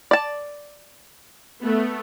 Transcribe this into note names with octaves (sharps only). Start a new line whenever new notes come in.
D5 A5
A3 B3